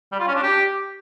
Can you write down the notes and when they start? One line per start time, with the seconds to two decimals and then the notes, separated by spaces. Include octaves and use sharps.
0.12 G3
0.20 F4
0.27 C#4
0.35 D4
0.43 G4